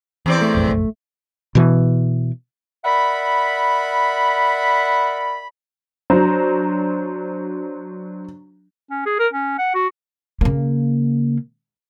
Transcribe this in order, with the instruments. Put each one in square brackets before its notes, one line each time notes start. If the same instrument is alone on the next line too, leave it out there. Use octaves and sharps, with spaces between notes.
[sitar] E2 C4 D5 [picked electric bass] E3
[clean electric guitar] A3
[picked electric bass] F1 A#1 F#2
[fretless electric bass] B2 E3
[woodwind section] A#4 D5 E5 F#5 B5
[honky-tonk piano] F#3 D4 C5 A#5
[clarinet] C#4
G#4
A#4
C#4
F#5
F#4
[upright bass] C#3 A#3